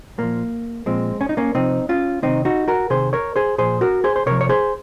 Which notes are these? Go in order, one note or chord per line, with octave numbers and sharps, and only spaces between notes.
A#2 F3 A#3
A#2 F3 G#3 C4
C#4
D#4
A#3 C#4
C3 F3 C4 D#4
C#4 F4
C3 D#3 C4 D#4
D#4 F#4
F#4 A#4
C3 D#3 G#4 C5
A#4 C#5
G#4 C5
A#2 F3 G#4 C5
F#4 A#4
G#4 C5
C5
C3 F3 A#4 C#5
C#5
G#4 C5